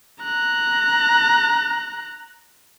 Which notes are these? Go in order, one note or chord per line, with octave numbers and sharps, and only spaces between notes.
A#5 F#6